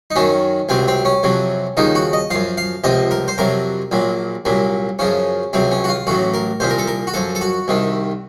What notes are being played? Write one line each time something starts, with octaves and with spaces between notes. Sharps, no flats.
D#4
F#2 D#3 F#3 C#4
C#2 C3 F#3 C4
C4
C#4
F2 C3 F#3
D#2 C#3 F3 D#4
F#4
D#5
F#2 F3 F5
F5
C#2 C3 F3 D#5
A#4
C5
F2 C3 F#3 A#4
A#1 A#2 F#3
C2 A#2 F#3
F#2 C#3 F3 C#4
C#2 C3 F#3 C4
C#4
F#4
F4
A1 A2 F#3 F#4
A#4
C2 A#2 F3 C5
A#4
A4
A#4
F#4
F#2 F3 A4
A4
F#4
C2 C3 D#3